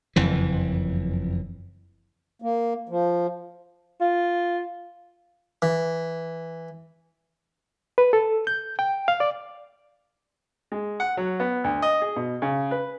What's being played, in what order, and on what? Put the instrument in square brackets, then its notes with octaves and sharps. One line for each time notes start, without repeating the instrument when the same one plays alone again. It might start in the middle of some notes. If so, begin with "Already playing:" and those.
[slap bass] F#1 F2 E3
[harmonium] A#3
F3
[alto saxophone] F4
[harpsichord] E3
[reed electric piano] B4
A4
G6
G5
F5
D5
[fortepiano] G#3
F#5
F#3
B3
D2
D#5
G#4
B2
C#3
B4